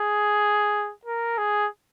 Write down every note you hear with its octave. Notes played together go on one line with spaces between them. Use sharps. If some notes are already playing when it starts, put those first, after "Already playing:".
Already playing: G#4
A#4
G#4